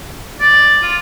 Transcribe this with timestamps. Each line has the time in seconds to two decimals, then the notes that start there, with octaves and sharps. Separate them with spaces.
0.40 D5
0.82 F4